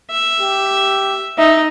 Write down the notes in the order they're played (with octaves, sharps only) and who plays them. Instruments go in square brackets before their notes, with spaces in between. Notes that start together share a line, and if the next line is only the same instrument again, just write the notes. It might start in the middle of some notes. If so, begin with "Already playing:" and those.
[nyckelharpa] E5
[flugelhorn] G4
[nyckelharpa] D#4 [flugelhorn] E5